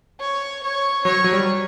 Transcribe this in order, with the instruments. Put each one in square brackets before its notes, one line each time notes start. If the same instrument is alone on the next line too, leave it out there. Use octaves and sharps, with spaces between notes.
[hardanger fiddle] C#5
C#5
[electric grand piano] F#3 [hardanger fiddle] C#5
[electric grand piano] F#3
G3